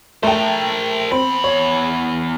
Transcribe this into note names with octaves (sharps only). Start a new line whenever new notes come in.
A3 A#4 C5 G5
E2 C4 B5
C#5